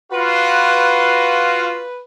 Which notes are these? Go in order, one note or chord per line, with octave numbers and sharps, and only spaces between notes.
F4 F#4 B4